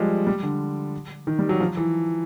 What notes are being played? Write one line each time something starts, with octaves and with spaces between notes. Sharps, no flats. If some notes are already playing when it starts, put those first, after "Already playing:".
Already playing: F3 G3 G#3
G3
D3
D#3
G3
F#3
F3
E3